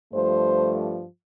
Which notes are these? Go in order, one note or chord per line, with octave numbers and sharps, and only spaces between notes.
G2 F3 A3 C5